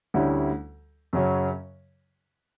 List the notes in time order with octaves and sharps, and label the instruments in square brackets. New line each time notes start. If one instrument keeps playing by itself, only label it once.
[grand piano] D2 D3 G3 C#4 E4
F#2 C#3 F#3 C#4